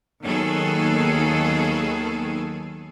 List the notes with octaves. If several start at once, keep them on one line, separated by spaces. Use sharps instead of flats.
D#2 D#3 F#3 B3 G#4 A4